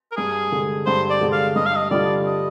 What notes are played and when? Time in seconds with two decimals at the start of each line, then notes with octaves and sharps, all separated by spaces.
0.12 A#4
0.16 G2 G#4
0.52 D3 G#3
0.86 G2 C5
1.10 D5
1.21 D3 G#3
1.32 F5
1.56 G2 D#5
1.66 F5
1.76 D#5
1.90 D3 G3 D4 F4 D5
2.26 D#5